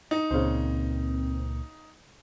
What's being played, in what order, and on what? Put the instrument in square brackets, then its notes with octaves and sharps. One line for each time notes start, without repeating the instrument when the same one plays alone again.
[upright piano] D#4
[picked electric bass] C#2 A#2 [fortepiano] C#3 C5 [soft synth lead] C4